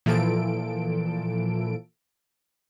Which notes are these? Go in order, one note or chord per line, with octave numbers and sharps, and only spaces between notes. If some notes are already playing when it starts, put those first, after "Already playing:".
A#2 E3 F3 A4 D7